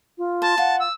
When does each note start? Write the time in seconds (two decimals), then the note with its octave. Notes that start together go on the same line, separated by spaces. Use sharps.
0.18 F4
0.42 C5 A5
0.58 F4 F#5
0.80 E6